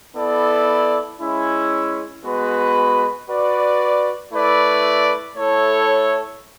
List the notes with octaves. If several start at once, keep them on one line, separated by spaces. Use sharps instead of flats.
B3 E4 A4 D5
G#3 C#4 E4
G#3 B3 F#4 B4
F#4 B4 D5
A3 E4 B4 D5
A3 E4 A4 C#5